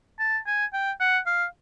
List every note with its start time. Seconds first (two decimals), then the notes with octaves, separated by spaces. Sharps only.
0.19 A5
0.47 G#5
0.73 G5
1.00 F#5
1.26 F5